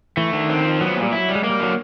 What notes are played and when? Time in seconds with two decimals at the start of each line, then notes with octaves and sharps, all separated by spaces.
0.17 E3 A3
0.33 D3 D#3
0.50 C4
0.64 F3
0.81 F#3 B3
0.96 A#2
1.02 G3
1.12 F#3 E4
1.28 G3
1.35 G#3
1.44 A#3
1.50 G3
1.60 D3 F#3